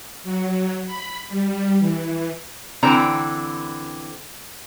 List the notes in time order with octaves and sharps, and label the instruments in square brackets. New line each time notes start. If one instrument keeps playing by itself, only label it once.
[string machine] F#3
B5
G3
E3
[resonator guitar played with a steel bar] D3 E3 C4 A#5